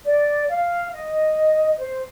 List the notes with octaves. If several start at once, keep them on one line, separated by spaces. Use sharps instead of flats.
D5
F5
D#5
C5